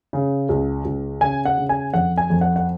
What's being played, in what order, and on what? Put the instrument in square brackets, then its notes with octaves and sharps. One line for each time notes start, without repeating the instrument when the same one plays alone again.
[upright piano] C#3
C#2
C#2
C#3 G#5
F#5
C#3
G#5
F2 F#5
G#5
F2
F#5
F#5